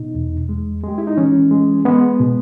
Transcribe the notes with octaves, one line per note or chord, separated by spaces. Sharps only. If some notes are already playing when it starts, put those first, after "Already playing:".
Already playing: B2 D#4
E2
G#3
G#3 G4
E4
D#4
E3 C#4
G#3
G#3 B3
B2